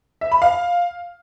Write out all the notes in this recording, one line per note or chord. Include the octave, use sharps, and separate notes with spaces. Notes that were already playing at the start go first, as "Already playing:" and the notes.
E5
B5
F5